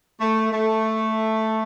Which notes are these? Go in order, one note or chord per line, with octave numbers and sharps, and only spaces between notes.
A3
A3